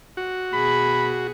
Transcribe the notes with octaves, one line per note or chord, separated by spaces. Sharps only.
F#4
B2 G#4 B5